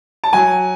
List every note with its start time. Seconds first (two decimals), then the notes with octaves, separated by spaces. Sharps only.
0.24 A5
0.33 F#3 G#5